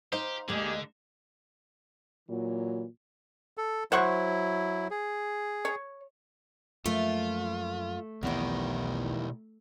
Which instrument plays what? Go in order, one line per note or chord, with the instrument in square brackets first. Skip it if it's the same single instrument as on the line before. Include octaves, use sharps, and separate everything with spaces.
[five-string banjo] D#4 C5 [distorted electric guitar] G4 [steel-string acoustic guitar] F5
[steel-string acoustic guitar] D2 G#3 D#5 [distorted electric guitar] D3 [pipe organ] A#3 G4 G#4
[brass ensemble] A#2 E3 F#3
[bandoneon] A4
[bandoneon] F#3 E4 [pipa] C5 F#5 C#6
[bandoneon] G#4
[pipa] C#5
[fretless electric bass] F#2 F3 A#3 [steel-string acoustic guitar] A3 [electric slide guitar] F4
[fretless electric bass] B1 F3 B3 [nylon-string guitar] E2 D#3 [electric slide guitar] B2 E4 G4